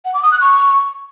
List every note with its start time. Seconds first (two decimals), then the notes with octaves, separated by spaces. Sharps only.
0.05 F#5
0.14 D6
0.23 D#6
0.32 F#6
0.41 C#6